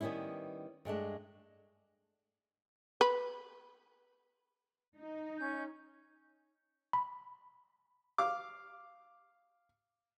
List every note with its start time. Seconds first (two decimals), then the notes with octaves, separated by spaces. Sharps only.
0.01 D#3 G3 B3 C#4 E4
0.85 G2 G#3 A3 D4
3.01 B4
4.96 D#4
5.38 C#4 G6
6.93 B5
8.18 F5 D6